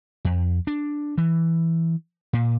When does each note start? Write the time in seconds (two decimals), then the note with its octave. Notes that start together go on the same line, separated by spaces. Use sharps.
0.25 F2
0.67 D4
1.18 E3
2.33 A#2